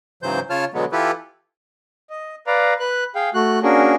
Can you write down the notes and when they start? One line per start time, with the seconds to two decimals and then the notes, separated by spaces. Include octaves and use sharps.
0.23 G#2 C#3 E3 F#3 C5 G6
0.50 C#3 F4 C#5 A5 F6
0.74 B2 D3 F#3 G#3 B3
0.92 E3 E4 F4 G4 A4 B4
2.10 D#5
2.47 B4 D5 F5 A#5
2.80 B4 F#6
3.15 G#4 F5 G5
3.34 A3 F#4 F#6
3.63 A#3 C#4 D4 F#4 G#4 A#4